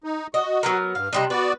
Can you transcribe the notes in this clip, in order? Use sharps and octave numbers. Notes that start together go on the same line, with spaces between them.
D#4
F#4 D#5
F#3 B3 A#4
G2 F5
C3 G3 D4 D#5
B3 F#4 B4 D5